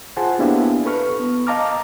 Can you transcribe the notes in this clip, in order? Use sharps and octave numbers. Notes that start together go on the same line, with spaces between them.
F4 G#4 C5 F#5 G#5 A5
A#3 B3 D4 E4 G4 F5
A4 B4 C#6 F6
B3
D#5 F5 A5 A#5 D6 F6